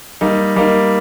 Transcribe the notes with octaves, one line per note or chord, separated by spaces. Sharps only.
G3 A#3 D#4
G3 A#3 D#4